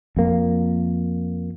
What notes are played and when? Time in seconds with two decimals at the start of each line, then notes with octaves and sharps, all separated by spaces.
0.17 F2 A#3